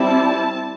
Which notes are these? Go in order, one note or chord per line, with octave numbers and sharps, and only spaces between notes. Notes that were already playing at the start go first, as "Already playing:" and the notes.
Already playing: G3 C4 E4 A5